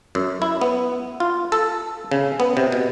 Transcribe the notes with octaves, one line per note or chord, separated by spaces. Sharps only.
F#2
E4
B3
F4
A4
C#3
B3
C3
B2